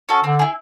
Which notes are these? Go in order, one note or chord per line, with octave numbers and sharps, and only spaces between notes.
C#4 F#4 A4
D3 C4
E4 G#4